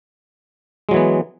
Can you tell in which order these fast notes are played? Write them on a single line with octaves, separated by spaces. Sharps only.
G#3 F#3 E3 B3